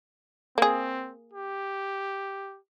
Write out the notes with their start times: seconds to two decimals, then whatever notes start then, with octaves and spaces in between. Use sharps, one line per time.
0.58 A#3 C4 G#4
1.33 G4